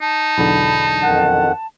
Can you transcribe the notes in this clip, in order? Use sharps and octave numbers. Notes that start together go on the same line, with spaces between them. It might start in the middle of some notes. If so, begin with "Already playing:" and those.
D#4 A5
B1 E2 D3 B5
F2 D#3 F#5